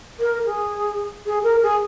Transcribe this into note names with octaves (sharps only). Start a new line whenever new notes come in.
A#4
G#4
G#4
A#4
G#4